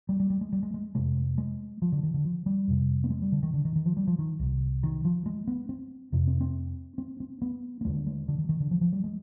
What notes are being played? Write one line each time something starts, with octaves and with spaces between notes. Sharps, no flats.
G3
G3
G3
G#3
G3
G#3
G#3
F2 C3 G#3
G#3
F3
D3
D#3
D3
F3
G3
F2 C3
B3
G#3
G3
D3
D#3
D3
D#3
D#3
F3
G3
F3
D#3
C2 C3
D#3
F3
G#3
B3
C4
F2 C3
C4
C4
C4
C4
B3
B3
D#2 D3 G#3
G#3
D3
D#3
D#3
D3
F3
F3
G3
G#3